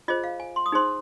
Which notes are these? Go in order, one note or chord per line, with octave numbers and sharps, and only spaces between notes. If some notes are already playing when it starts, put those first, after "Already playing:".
F4 G#4 C5 D#5
F5
G#5
C6
D#6
D#4 G#4 C5 C6